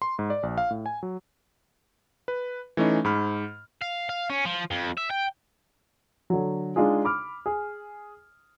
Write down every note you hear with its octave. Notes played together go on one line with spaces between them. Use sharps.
C6
G#2
D5
A#1
F5
A2
G#5
F#3
B4
E3 A3 C#4 D#4
G#2 B5 F6
F5
F5
C#4
F3
F2
E5
G5
D3 F#3
G#3 D4 D#4 F4 G#4
B5 D6 F6
G#4